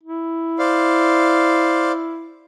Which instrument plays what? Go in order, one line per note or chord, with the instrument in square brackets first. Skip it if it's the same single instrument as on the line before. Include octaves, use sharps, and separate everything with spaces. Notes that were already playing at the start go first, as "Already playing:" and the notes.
[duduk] E4
[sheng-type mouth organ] C5 D5 F5